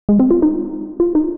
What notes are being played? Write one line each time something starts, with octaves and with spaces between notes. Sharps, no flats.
G#3
C4
F4
D#4
F4
D#4